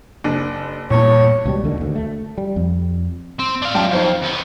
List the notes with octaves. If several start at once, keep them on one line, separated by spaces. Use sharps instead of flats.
F#1 D4
E2 G2 A#2 C#5
C#2 B2 G3
D#2 D3 D#3
D2
A3
G3
F2
C4
D4 F5
F#2 G5 A5
F2 D#4 C5 F5
D#2 B3